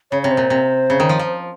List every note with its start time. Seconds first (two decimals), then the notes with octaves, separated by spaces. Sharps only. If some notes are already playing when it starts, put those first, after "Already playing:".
0.11 C#3 C#5
0.22 C3 C#5
0.31 C5
0.37 A#2
0.50 C3
0.90 C#3
1.00 D#3
1.09 F3
1.19 F3